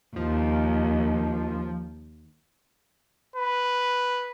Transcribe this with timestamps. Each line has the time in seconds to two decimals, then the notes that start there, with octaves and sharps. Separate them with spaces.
0.16 D#2 F3
3.36 B4